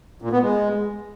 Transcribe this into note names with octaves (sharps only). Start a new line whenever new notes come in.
A#2
B3
G#3